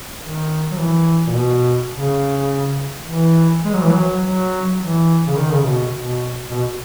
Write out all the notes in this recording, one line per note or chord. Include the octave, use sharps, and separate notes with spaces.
D#3
F#3
E3
A#2
B2
C#3
E3
G#3
F#3
E3
F#3
F#3
E3
C#3
D#3
C#3
B2
B2
B2